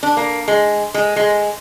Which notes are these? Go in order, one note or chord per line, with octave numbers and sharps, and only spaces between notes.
D4
A#3
G#3
G#3
G#3